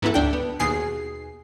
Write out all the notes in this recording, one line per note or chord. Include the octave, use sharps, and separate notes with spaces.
G#2 E3 B3 E4 A4
D2 D4 G5
B3
D#2 B2 G#4 C7